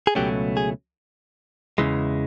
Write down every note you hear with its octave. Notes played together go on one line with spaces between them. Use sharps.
G#4
C#2 B2 F#3 A3 C#4 G4
G#4
E2 C#3 E3 G#3